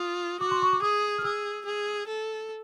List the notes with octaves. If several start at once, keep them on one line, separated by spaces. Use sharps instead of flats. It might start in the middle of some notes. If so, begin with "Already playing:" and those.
Already playing: F4 D#6
F#4 D6
C6
C#6
D6
G#4 D#6
F6
G#4 E6
G#4
A4